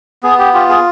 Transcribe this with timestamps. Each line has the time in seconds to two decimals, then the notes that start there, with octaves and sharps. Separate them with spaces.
0.23 B3 G#4
0.39 G4
0.54 F4 G4
0.69 G#4